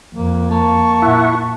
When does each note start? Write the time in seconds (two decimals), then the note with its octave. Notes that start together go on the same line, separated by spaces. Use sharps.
0.15 F2 A#3
0.51 A#3 A5 C#6
1.02 A#2 E4 E5 F#5